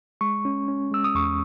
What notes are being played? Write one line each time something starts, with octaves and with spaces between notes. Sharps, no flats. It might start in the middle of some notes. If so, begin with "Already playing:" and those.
G#3 C#6
C#4
C#4
G#3 E6
D#6
E2 C#6